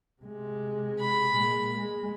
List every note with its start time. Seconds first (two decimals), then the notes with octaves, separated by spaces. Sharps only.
0.22 C3 G#3
0.99 B5
1.33 A#2 G#3
1.74 G#3